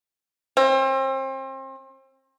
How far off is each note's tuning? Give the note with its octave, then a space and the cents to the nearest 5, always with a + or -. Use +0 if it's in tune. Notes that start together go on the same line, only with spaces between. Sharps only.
C4 +35